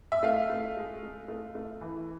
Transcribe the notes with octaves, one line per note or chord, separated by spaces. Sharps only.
E5
A3 F5
A3
G#3
G#3
A3
A3
E3